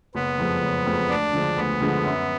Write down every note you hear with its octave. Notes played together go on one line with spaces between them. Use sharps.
F#1 B3
F2 F3 G#3
F#1
F2 F3 G#3
D2 D4
D3 F3 G#3
D2 B3
D3 F3 G#3
F#2